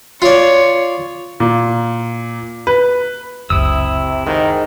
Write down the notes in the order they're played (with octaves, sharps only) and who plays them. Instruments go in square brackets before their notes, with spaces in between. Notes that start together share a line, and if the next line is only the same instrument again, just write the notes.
[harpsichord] F4 D5 [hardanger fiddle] C#5
[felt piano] A#2
B4
[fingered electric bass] F#1 C#2 [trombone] C3 [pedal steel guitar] E4 D#6 E6
[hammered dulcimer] G#2 [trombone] D#3